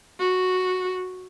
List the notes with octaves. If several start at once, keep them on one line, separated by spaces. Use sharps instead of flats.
F#4